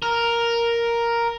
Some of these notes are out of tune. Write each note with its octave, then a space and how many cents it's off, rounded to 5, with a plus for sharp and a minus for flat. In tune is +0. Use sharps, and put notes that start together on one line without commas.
A#4 +5